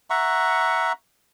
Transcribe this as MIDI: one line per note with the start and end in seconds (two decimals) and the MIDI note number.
0.10 0.92 76
0.10 0.92 78
0.10 0.92 82
0.10 0.92 85